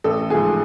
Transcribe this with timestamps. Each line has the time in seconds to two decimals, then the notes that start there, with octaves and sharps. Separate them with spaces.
0.04 A1 A4
0.30 G#2 F3 A3 G#4